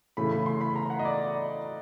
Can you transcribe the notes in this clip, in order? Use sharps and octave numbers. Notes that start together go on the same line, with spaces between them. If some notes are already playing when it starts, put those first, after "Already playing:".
C#3 E3 A3 B5
B5
C6
B5
A#5
F#5
D#5
D5